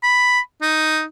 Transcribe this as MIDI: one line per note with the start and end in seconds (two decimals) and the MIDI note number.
0.03 0.39 83
0.62 1.03 63